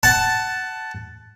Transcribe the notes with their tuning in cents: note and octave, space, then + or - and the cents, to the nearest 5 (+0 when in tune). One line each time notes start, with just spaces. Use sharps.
F#5 +15 A5 +0